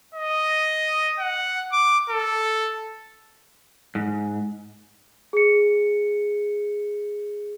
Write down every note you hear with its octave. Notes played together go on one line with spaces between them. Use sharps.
D#5
F#5
D6
A4
G#2
G#4 C#7